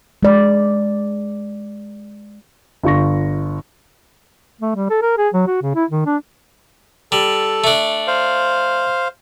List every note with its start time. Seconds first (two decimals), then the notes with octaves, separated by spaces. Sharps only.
0.23 G#3 D5
2.84 G1 F4 C#6 A#6
4.61 A3
4.75 G3
4.90 A4
5.02 A#4
5.18 G#4
5.34 F#3
5.47 F#4
5.62 C#3
5.75 E4
5.91 D#3
6.06 D4
7.12 G3 A4
7.64 A3 D4
8.08 C5 F5